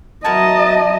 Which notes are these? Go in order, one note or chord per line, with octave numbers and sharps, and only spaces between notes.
F#3 E4 F#4 A#4 D#5 A5